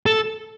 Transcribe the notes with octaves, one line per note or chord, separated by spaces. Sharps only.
A4